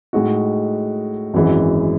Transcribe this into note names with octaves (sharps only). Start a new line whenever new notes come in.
A2 G#3 D#4 F#4
G#1 F#2 E3 G#3